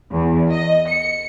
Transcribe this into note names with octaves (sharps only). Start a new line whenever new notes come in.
E2
D#5
C#7